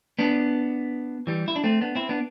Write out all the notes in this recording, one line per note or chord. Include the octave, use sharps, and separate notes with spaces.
B3 D4
E3 G3
E4
D4
A3 C4
B3 D4
C4 E4
B3 D4